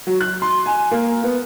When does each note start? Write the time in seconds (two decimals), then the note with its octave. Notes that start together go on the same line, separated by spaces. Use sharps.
0.07 F#3
0.21 F#6
0.42 C6
0.66 G#5
0.91 A#3
1.24 B3